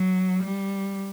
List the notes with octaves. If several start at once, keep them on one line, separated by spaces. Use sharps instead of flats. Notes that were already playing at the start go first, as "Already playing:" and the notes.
Already playing: F#3
G3